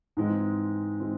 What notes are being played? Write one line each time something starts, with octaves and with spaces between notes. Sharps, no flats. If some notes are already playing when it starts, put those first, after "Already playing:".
G#2 E3 G#3 C4
E3 G#3 C4